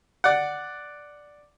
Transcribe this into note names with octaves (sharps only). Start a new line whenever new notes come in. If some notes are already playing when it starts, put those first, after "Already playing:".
D5 F#5